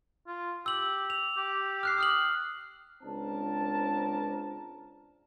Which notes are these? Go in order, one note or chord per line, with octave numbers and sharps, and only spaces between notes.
F4
G4 E6 F#7
F7
G4
F6 F#6 C7
D#6 F6 F#7
C#2 C4 D4 A#4 A5